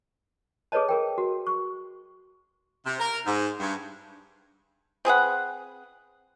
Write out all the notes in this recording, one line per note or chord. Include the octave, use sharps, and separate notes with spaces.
G#4 A4 B4 C#5 D#5 A5
G#4 A#4 G5
F#4
C#6
C3
A#4
G#2
G2
C4 G#4 B4 F#5